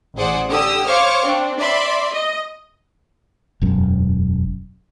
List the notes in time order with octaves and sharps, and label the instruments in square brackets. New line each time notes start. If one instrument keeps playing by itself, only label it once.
[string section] A1 G#4 C5 D5 F#5
D3 G4 D#6 E6
C5 C#5 F5 C#6 D6 F6
C4 D4
D5 E5 B5 C6 D6
D#5
[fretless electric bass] E1 F#2